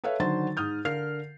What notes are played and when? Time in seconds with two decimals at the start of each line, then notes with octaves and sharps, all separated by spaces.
0.04 A4 B4 C#5 E5 F5
0.20 D3 D#3 F#3 C5 C6 A6
0.57 G#2 D#6 F6 G6
0.85 D3 A#4 F5 F6 C7